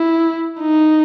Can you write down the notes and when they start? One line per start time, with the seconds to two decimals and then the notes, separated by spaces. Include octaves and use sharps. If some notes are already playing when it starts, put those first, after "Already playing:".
Already playing: E4
0.61 D#4